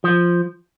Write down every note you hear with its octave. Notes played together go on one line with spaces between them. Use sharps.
F3